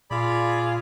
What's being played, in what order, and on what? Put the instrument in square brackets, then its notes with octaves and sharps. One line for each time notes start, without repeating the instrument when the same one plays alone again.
[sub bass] A#2 [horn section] F4 G#4 [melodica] D5 B5